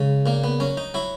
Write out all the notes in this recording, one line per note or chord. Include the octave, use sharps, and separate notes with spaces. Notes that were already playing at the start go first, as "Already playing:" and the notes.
Already playing: C#3 G#3
A#2 A#3
B3
F#3 C#4
D#4
F#3 E4